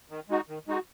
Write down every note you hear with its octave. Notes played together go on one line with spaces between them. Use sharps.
D#3
G#3 D#4 F#4
D#3
G#3 D#4 F#4